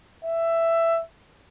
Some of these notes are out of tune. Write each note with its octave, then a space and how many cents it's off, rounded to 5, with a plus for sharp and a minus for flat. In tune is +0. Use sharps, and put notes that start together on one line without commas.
E5 +10